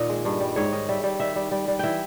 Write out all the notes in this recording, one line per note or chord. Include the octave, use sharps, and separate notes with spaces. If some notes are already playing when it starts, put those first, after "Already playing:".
Already playing: A#2 D#3 D#5
G#3
G2
G3
G#2 C#5
D#3 D#5
G3 E5
G3
D#3 E5
G3
G3
G3
E3 E5 G5